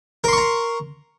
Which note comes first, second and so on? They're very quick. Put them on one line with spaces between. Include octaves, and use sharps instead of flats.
A#4 C6 C#6 A#5